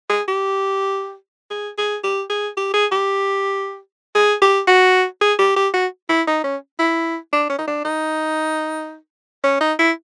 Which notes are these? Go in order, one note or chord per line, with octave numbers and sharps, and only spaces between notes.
G#4
G4
G#4
G#4
G4
G#4
G4
G#4
G4
G#4
G4
F#4
G#4
G4
G4
F#4
E4
D#4
C#4
E4
D4
C#4
D#4
D4
D#4
C#4
D#4
E4